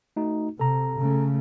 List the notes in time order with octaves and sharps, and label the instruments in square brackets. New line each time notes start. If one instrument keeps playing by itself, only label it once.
[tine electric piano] A3 D#4 F#4
[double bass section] C3 [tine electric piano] A4 A#5
[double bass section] C#3 A3